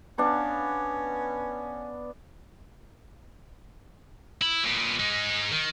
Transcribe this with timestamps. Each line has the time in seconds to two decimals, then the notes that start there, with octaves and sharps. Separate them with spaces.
0.18 B3 C#4 D4 F5
4.42 E4
4.64 A#2 B3
4.99 G#3 D#4
5.52 D#3